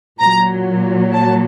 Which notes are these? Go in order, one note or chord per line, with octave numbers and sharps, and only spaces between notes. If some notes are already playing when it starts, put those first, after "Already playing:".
A#2 F#3 A#5
A5